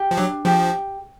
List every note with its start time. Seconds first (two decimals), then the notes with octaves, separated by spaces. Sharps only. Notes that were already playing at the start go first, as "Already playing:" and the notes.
Already playing: G4
0.11 F3
0.17 F#3 D4
0.45 F3 G4